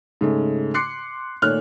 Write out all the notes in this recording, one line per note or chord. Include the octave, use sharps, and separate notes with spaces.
G#2 C#3 A3
C6 D6 F#6 C7 C#7
A#2 D#3 A3 C#5 F6 F#6